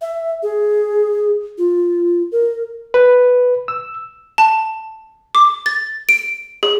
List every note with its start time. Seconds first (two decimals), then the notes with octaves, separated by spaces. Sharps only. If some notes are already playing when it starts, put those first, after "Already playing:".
0.01 E5
0.43 G#4
1.58 F4
2.32 A#4
2.94 B4
3.68 E6
4.38 A5
5.35 D6
5.66 A6
6.09 D7
6.63 G#4